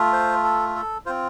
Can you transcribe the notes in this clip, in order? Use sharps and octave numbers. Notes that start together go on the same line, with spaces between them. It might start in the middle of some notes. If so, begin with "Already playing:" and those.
Already playing: A3 F4
C5
A4
A4
C4 F4 C5